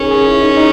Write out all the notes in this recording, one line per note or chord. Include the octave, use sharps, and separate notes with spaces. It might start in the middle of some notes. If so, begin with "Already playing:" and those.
Already playing: C#4 D#4 G#4 A#4
G#4
E4
D#4
D#4